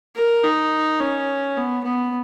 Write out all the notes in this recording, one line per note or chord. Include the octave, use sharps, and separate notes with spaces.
A#4
D#4
C#4
B3
B3